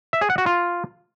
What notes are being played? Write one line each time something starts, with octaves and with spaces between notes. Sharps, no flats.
E5
G#4
F#5
F#4
F4